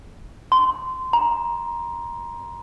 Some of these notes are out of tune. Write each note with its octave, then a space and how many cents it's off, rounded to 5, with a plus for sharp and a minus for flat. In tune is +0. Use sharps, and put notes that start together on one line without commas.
C6 -20
A#5 +20